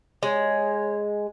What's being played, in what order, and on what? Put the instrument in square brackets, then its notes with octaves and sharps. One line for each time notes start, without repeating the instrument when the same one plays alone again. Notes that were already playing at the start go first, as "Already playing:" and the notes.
[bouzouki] G#3 [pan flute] C#5